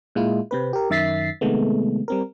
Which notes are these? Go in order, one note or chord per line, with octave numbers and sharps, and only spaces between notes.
A#2 G#3 E4 F4
C3 C4 B4
G4 A#4
F#2 D#3 E5 A6 B6 C7
C3 D#3 G#3 A3 B3
G3 C4 A#4